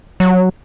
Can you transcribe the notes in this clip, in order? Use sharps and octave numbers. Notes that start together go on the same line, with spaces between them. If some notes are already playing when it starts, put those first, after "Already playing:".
F#3